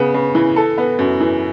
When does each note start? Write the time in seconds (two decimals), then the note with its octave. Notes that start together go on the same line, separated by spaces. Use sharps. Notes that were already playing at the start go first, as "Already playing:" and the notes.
Already playing: C#3 B3
0.14 C#3
0.35 E3
0.56 A4
0.78 B3
0.99 F#2
1.20 E3